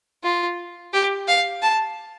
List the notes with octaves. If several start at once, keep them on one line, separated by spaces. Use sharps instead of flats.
F4
G4
F5
A5